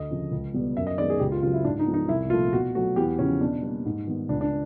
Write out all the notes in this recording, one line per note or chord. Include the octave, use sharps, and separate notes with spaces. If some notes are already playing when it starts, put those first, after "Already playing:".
Already playing: D2 D#5
C#3 F3
C#2
B2 G3 B3
F#2 E5
D#5
D#3 G#3 B3 D5
G#4
C#2 G4
F4
C#3 F#3 F4
E4
G#2 D4
D#4
F3 G#3 B3
D#4
C2 E4
A#2 F3 A3 F4
B2 F#4
F#3 A3 F#4
E2 G4
C#3 F3 C#4
B2 D4
G3 A#3
G#2
D#3 G3 B3
C#2 D4
D4